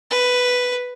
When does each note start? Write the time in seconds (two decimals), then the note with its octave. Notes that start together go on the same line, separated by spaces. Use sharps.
0.11 B4